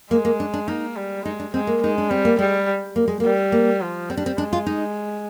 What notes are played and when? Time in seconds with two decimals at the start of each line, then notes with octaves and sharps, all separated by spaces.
0.11 G#3 A#3
0.25 A#3
0.40 D4
0.54 D4
0.68 A#3 D#4
0.96 G3
1.25 G#3 D#4
1.40 D4
1.54 G#3 C4
1.67 A#3
1.81 G#3 D#4
1.98 D4
2.10 G3 C4
2.25 A#3
2.39 G3 G#3
2.96 A#3
3.08 G#3
3.20 G3 A#3
3.52 A#3
3.81 F3
4.10 G3 C4
4.17 D4
4.26 C4
4.38 G#3 D4
4.53 F4
4.67 D#4